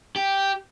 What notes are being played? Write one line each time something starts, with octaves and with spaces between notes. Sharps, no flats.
G4